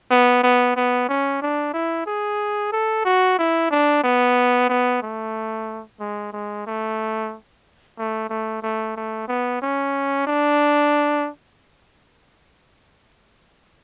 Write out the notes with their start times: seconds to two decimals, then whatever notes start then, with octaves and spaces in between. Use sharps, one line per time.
0.11 B3
0.43 B3
0.76 B3
1.09 C#4
1.42 D4
1.73 E4
2.06 G#4
2.72 A4
3.05 F#4
3.39 E4
3.71 D4
4.04 B3
4.69 B3
5.02 A3
6.00 G#3
6.33 G#3
6.67 A3
7.98 A3
8.30 A3
8.62 A3
8.96 A3
9.28 B3
9.62 C#4
10.27 D4